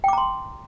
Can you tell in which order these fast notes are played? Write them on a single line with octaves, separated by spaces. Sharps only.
G5 D6 A#5 C6